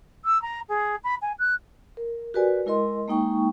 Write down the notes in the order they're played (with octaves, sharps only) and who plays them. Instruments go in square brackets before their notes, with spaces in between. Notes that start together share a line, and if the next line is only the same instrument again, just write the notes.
[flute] E6
A#5
G#4
B5
G#5
F#6
[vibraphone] A#4
F#4 G4 A#4 B4 D5 G#5
G#3 E4 A#4 D#5 C6
G#3 A#3 D#4 G5 C#6